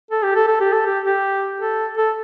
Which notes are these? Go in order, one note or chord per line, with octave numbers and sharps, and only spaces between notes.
A4
G4
A4
A4
G4
A4
G4
G4
A4
A4